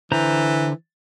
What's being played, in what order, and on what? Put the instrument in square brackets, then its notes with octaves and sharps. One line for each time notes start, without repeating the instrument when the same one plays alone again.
[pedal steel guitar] D3 C5 A#5 [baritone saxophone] E3